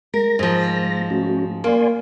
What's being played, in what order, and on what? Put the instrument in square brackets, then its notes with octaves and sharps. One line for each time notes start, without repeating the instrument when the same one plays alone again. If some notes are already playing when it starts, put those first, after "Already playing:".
[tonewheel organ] G#3 A#6 [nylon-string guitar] A#4
[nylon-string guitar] G#2 F3
[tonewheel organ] A3 C#4 F#4
[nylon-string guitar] A#3 [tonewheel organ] D5 G#5 C6